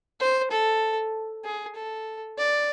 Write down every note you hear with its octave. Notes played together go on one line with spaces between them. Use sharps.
C5
A4
G#4
A4
D5